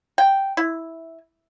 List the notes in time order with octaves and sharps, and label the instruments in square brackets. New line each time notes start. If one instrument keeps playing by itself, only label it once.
[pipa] G5
E4